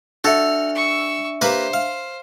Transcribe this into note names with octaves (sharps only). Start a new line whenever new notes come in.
D4 F#4 A4 E5 F6
C#6 E6
A#3 G4 B4 C5
F5